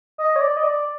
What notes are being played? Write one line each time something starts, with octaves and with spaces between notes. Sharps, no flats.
D#5
C#5
D5
D#5
D5